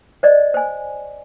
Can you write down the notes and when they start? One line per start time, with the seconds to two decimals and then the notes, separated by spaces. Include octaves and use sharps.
0.23 C5 D5 D#5
0.54 C5 G#5